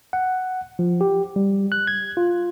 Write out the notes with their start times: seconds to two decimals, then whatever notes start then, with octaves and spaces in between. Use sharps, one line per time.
0.13 F#5
0.79 F3
1.01 G4
1.36 G3
1.72 F#6
1.87 G#6
2.17 F4